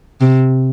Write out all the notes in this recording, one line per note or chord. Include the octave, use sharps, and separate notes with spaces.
C3